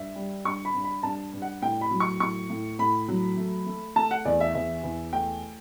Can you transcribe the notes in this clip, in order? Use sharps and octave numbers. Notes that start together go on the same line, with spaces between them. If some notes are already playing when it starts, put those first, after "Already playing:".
Already playing: G2 E5
G3
G2 C#6
B5
G2
B5
G2 A5
G2
F#5
A2 G5
B5
F#3
C#6
A2 C#6
A2
A2 B5
F#3
A3
A3
A3 A5
F#5
E2 D5
E5
E2 E5
E2
A3 G5